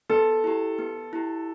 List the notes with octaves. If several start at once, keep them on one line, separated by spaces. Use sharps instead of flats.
B3 A4
E4 G4
B3
E4 G4